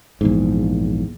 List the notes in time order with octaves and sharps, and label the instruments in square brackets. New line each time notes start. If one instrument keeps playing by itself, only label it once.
[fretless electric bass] A#1 E2 G#2